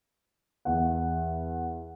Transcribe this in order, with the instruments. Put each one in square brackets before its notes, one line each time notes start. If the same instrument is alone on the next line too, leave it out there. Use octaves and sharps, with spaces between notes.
[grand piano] E2 F#5